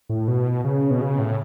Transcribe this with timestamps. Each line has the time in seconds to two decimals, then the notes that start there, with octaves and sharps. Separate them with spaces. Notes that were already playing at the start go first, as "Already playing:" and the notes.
0.09 A2
0.28 B2
0.64 C#3
0.91 B2
1.01 C#3
1.19 A2